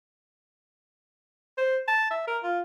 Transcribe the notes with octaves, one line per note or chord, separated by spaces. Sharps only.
C5
A5
E5
A#4
F4